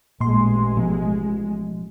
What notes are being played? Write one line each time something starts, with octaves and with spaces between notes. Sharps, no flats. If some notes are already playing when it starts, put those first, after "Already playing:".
A1 A#2 G#3 C6
B2 F3